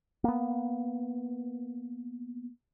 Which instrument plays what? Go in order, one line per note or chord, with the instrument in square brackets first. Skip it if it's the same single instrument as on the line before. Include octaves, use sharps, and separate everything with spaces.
[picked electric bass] A#3 B3